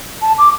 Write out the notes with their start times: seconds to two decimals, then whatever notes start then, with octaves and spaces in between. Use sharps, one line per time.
0.21 A5
0.38 D6